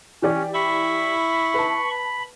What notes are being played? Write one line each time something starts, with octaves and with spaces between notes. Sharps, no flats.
E3 C#4 G4 D5
E4 B5 C#6
B4 A5
B5